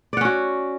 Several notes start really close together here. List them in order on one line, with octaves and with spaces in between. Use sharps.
D5 F#5 C#4 F#4